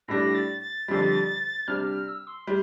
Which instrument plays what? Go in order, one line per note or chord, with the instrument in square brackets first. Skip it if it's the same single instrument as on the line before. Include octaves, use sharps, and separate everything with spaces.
[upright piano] A2 G3 D4 [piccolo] A#6
[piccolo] A6
A6
[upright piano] F2 D3 G3
[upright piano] C3 G3 D4 [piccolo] F6
[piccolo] F6
E6
C6
[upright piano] G3